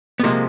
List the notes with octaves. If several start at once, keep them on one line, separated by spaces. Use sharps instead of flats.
B3
C3 F3 G#3 A#3